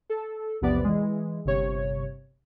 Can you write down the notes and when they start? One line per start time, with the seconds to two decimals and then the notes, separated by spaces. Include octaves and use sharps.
0.10 A4
0.61 A#1 E2 C3 B3 D5
0.84 E3 G#3
1.45 G1 C3 C#5